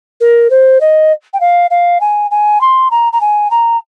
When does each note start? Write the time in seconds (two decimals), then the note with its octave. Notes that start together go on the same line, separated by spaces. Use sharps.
0.20 A#4
0.50 C5
0.80 D#5
1.33 G5
1.40 F5
1.70 F5
2.01 G#5
2.31 G#5
2.61 C6
2.91 A#5
3.13 A#5
3.21 G#5
3.51 A#5